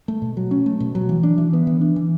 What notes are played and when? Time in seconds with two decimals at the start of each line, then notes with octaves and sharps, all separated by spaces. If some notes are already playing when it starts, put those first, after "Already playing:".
0.08 A3
0.22 B2
0.37 F#3
0.51 C#4
0.66 A3
0.80 B2
0.95 F#3
1.09 E3
1.23 D4
1.38 E3
1.53 B3
1.67 E3
1.81 D4
1.96 E3